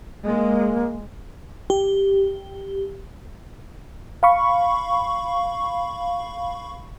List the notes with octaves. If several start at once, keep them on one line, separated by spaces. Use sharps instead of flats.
G#3 A#3
G4
F5 B5 C#6